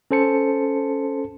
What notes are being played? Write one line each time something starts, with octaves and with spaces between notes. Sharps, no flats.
C#4 A4 C5 A5 C#7